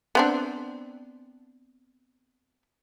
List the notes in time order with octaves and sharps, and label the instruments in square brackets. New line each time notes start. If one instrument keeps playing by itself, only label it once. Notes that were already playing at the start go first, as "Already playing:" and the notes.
[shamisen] B3 C4 D4